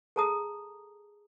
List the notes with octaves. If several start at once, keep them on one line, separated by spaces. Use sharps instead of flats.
G#4 A4 A5 A#5 D#6